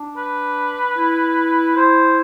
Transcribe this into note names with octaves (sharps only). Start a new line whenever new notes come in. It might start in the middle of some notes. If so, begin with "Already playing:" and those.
Already playing: D4
B4
E4
E4 C5